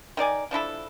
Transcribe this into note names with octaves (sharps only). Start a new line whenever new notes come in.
D#3 A#4 D5 G#5
F3 D4 E4 A4